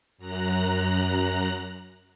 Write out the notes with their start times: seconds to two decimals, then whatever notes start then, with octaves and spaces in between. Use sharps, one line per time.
0.18 F#2 A#5 F#6